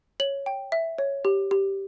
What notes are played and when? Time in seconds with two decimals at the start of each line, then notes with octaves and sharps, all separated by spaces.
0.20 C#5 F#7
0.46 G5
0.72 E5
0.98 C#5
1.25 G4
1.51 G4